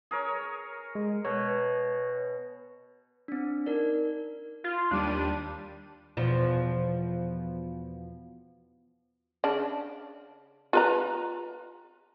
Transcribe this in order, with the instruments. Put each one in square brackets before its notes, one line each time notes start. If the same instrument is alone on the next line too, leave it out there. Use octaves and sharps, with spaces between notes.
[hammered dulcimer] G#4 A#4 C#5
[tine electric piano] G#3
[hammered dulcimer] B2 [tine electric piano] C#5
[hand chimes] C4 D4
D#4 A#4 D5
[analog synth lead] F4
[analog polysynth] D#2 G3 D#7 [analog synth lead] D4
[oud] E2 B2 F3
[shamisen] C#3 D4
F4 B4 A#5